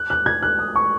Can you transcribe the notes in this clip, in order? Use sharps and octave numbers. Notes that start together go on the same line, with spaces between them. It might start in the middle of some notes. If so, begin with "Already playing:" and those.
Already playing: F#6
F#6
G#6
F#6
D#6
C#6